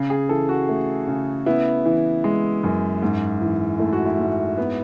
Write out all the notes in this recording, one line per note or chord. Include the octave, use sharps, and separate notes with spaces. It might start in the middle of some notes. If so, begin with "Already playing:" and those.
Already playing: C#3
G#4
E3 A4
F#4
A3
C#3
B3 E4
E3
G#3
F#2
G#2
E3
A3 E4
F#4
E4
G#2
B3